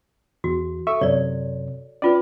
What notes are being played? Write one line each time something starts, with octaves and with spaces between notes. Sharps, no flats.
E2 F#4
A4 E5 C#6
F#2 C3 C#5 D5
C#4 F4 B4 D5